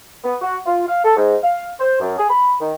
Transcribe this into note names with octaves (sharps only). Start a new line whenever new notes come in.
B3
F#4
F4
F5
A4
G#2
F5
C5
F#2
G#4
B5
D#3